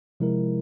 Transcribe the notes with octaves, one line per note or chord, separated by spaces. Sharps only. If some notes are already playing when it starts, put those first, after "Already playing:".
C3 F3 G#3 E4 A#4